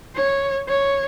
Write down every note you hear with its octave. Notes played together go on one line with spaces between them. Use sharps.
C#5
C#5